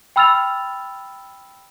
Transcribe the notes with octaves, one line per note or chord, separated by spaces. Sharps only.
G5 B5 E6 F6 A6 F7